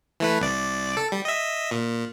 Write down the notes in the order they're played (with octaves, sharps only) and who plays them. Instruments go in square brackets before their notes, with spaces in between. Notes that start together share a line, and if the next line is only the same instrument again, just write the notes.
[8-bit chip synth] E3 A3 B4
C2 D5
A4
G3
D#5 E5
A#2